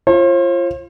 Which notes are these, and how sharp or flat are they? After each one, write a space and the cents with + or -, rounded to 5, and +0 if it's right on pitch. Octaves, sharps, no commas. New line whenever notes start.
F4 -20 C5 +45